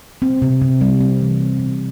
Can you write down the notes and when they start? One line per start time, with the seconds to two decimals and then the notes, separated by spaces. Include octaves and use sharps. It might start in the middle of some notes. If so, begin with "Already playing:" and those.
0.22 C4
0.42 C3
0.61 C3
0.81 G3
1.01 C4
1.21 E3
1.41 C4
1.60 C3